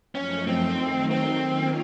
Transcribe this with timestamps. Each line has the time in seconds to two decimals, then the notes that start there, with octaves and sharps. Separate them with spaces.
0.15 F#2 F3 A3 C#4 D#4
0.47 C4
0.79 D#3 F#3 A3 D#4
1.11 C4
1.43 D#3 A#3 C#4 F4